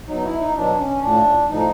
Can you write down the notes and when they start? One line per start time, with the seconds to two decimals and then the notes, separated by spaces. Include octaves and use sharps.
0.08 B2 F#3 D#4
0.24 E4
0.40 D#4
0.55 B2 F#3 D4
0.79 C#4
1.02 A2 F3 D4
1.49 A2 F3 D#4